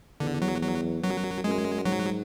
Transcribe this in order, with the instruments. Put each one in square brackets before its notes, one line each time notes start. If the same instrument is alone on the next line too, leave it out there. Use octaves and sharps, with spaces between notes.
[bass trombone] E2 [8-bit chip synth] D3
[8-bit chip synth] F#3
F#3
[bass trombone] F#2 [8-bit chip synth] F#3
[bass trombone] F#2 [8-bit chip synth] G#3
[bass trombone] G#2 [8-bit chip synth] F#3